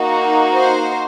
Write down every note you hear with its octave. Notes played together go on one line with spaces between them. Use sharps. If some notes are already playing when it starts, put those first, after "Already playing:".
Already playing: A#3 D#4 F#4
C5